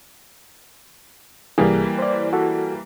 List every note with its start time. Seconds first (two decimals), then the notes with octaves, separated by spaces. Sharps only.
1.58 C2 E3 G3 A#3 G#4
1.99 C5 D5
2.33 F#4 A4